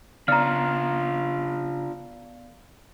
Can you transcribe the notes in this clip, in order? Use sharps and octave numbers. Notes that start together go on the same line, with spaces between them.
C#3 B3 D4 F4 D5 F5 A#5 F6